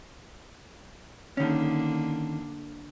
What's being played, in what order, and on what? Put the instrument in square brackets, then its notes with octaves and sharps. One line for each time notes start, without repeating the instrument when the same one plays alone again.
[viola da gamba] D3 A#3 D4 [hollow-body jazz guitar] D#3 C#4